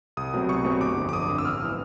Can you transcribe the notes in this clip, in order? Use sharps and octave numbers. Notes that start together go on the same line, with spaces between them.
C2 D#6
B2 F#3 A3 C4
C2 C#6
B2 F#3 A3 C4
G1 D6
F2 D3
D6
G1 D#6
F2 D3
E6
A1 F6
E3